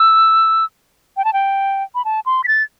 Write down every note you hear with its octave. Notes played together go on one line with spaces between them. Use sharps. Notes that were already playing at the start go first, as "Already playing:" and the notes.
Already playing: E6
G5
A5
G5
B5
A5
C6
B6
A6